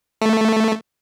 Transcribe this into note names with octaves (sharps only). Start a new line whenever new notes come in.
A3